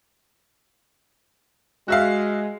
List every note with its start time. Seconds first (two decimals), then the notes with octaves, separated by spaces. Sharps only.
1.88 G#3 F#4 E5 F5